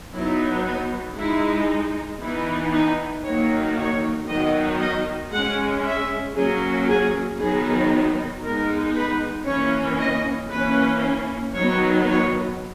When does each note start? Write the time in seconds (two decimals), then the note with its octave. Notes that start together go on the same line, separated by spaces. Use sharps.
0.12 F#3 B3 D#4 E4
0.65 D#4
1.16 G#3 D#4 E4
2.21 E3 B3 D#4 E4
2.72 D#4
3.24 D#3 F#3 A#3 D#4 C#5
3.77 C#5
4.27 D#3 F#3 B3 D#4 D#5
4.79 D#5
5.31 G#3 C#4 F#5
5.84 E5
6.36 F#3 A#3 C#4 G#4
6.88 G#4
7.39 D#3 F#3 B3 D#4 G#4
8.43 G#3 B3 D#4 A#4
8.96 B4
9.46 E3 A#3 C#4 C#5
9.98 D#5
10.50 E3 A#3 C#4 B4
11.54 D#3 F#3 B3 D#4 C#5
12.06 C#5